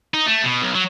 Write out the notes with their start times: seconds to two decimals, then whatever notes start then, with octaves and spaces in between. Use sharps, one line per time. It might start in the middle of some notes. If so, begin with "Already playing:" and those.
0.14 D#4
0.27 A3
0.44 B2
0.62 B1
0.75 F#3